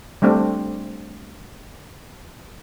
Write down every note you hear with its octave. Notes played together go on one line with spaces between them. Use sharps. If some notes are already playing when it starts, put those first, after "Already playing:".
G3 A3 C4 D4